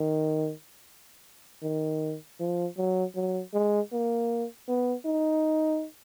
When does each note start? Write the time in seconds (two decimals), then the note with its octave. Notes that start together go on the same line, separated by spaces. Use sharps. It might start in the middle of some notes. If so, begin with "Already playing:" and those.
Already playing: D#3
1.62 D#3
2.40 F3
2.78 F#3
3.15 F#3
3.54 G#3
3.92 A#3
4.68 B3
5.06 D#4